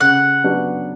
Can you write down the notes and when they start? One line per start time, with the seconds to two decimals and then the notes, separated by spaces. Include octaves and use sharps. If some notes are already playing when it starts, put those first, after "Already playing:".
0.01 C#3 F#5
0.44 F#3 B3 D4 F#4